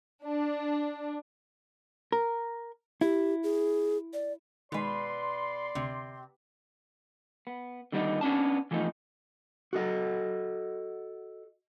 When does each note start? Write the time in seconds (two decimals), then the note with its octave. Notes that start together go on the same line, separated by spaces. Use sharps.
0.24 D4
2.12 A#4
3.01 E4 G4
3.43 G#4
4.13 D5
4.72 B2 D#3 G#3 B4 D5 C6
5.75 D2 C3
7.47 B3
7.92 D3 D#3 G3 B3 D4 D#4
8.21 B3 C#4 D4 A5
8.71 E3 F3 A3 B3 D#4
9.73 F#4 A4 D#5 F#5